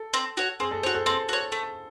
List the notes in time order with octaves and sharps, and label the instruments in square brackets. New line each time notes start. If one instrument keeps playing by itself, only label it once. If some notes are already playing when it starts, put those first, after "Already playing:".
Already playing: [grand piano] A4
[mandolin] C4
F#4 C#5
[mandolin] C4 [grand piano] G#4
[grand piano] A4
[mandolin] F#4 C#5 [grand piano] C5
[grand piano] A4
[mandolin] C4 [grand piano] A4
[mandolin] F#4 C#5
A3